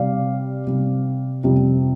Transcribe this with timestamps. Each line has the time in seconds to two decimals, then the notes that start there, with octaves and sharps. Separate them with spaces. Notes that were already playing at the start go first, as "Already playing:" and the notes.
Already playing: C3 G3 D5 F5
0.67 C3 G3
1.44 F2 C3 G3